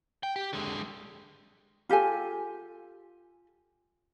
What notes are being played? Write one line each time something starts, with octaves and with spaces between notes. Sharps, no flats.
G5
G4
D3 G#3
F4 G4 A4 G#5